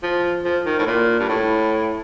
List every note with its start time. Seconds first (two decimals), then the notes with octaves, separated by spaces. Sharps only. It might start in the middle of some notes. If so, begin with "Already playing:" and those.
0.03 F3
0.45 F3
0.66 D#3
0.78 A2
0.86 A#2
1.19 G2
1.28 A2